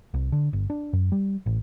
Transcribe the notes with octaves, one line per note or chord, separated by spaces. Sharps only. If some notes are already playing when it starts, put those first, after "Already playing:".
C2
D3
G1
D4
F#2
G3
A1